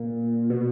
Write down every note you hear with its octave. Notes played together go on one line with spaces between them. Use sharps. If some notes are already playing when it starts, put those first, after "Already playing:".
Already playing: A#2
B2